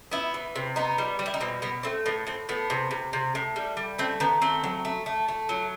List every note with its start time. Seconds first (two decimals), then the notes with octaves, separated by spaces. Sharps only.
0.11 B3 E4
0.34 E3
0.56 C3
0.76 B3 D#4
0.98 G3
1.19 G3
1.26 E4
1.34 D#4
1.40 B2 C4
1.62 B2 B3
1.83 A3 C4
2.06 A2 B3
2.27 A2 C4
2.49 A2 B3
2.70 C3
2.91 C3
3.13 C3
3.35 A2
3.56 G3
3.77 G3
3.98 A3 C4
4.20 D#3 B3
4.42 A3 C4
4.64 F#3
4.85 A3
5.06 A3
5.28 A3
5.49 F#3